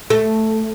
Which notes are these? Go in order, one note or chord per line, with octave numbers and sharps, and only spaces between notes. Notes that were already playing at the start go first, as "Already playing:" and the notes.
A3